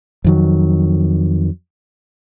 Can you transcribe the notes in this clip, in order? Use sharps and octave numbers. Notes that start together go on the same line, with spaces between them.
F2 D#3 F#3